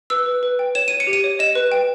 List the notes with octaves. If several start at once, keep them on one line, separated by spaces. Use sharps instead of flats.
B4 E6
B4
B4
G5
C#5 E7
C#5 D#7
C#7
G4
D#7
C#5
D#5 E7
B4
G5